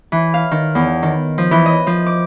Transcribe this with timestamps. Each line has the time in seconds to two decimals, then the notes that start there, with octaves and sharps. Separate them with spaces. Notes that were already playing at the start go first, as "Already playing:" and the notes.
0.12 E3
0.34 F5
0.51 D#3
0.75 E2
1.03 D#3
1.38 F3
1.51 E3
1.66 D#5
1.87 F3
2.06 D6